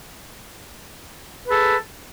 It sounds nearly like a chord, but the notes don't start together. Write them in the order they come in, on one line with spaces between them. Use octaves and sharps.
B4 G#4 A4